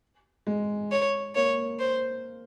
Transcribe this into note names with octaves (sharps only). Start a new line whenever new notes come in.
G#3
C#5
A#3 C#5
C5